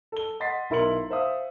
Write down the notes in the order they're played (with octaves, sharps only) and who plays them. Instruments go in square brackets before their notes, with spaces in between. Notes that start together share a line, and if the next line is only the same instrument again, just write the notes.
[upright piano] A4 G7
D#5 F#5 C6 A6 B6 C7
B1 E4 A#4 C6 C#7 F#7
C5 E5 F5 D#6